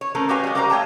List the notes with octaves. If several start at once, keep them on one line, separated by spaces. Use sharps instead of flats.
C#5
A3 C4 C#4 A4 A#4
F#4 G4 B4 C#5 F5 G#5
G3 G#3
G4 A#4 C5 F5 F#5 A#5
A3 C#5 G5 A5